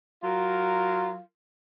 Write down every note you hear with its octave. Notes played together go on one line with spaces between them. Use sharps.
F#3 F4 A#4